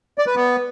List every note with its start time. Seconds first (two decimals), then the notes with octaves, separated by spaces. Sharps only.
0.18 D5
0.27 B4
0.36 B3